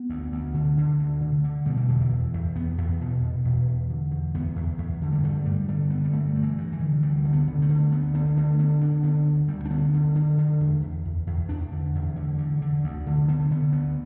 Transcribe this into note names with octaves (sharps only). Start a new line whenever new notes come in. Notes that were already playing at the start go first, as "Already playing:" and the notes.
Already playing: B3
D2
D2
D3
D3
D2
D3
D3
B2 G3
E3
E2 D3
E3
E2
E2
E2 B3
E2
B2
B2
E2
E2
D3
E2
E2 B3
E2
E2
D3
G3
G2 A3
G2 G3
D3 G3
D3 B3
G3
G2 A3
G2
E3
G2
E3
D3
D2 G3
D3
B3
D3
A3
D3
D2 B3
D3 B3
D3 A3
D3 B3
D3 D4
D3 B3
D2
D2 G3
D4
D3 B3
D3
D3
D3
E2
E2
E2
E2
E2 D4
D3
E2
D3
D3
D3
D2
D3
D3 B3
D3 B3
D2 B3